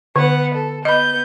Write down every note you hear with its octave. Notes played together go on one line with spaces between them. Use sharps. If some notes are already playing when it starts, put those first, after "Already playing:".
D3 B3 F#5
A4
B3 D#5 B5 G6